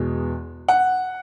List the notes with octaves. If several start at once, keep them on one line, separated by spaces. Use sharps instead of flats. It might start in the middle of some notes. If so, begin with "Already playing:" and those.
Already playing: E2 B2 G#3 B3
F#5